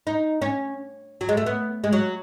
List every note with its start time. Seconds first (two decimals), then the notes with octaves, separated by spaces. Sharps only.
0.07 D#4
0.42 C#4
1.21 F#3
1.29 G#3
1.37 A3
1.46 B3
1.84 G#3
1.93 F#3